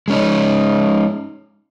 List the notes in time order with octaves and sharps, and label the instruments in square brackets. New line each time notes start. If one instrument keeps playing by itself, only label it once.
[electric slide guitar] G#3 C#4 D#4